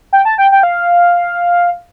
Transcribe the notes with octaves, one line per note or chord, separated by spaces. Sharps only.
G5
A5
G5
G5
F5